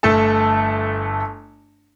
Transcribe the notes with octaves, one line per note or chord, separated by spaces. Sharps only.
G1 A3 A4 A5